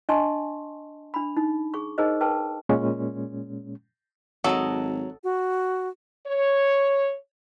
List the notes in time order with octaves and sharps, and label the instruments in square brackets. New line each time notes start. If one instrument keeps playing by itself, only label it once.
[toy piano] D4 D#5 G#5 A5 C6 C#6
D4 B5
D#4
G#4 C#6
D#4 G#4 A#4 C5 D#5
G#4 A#4 B4 G5 A5
[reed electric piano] A#2 G#3 C#4
[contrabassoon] G#1 [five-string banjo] F#3 [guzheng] A4 D#5
[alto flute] F#4
[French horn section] C#5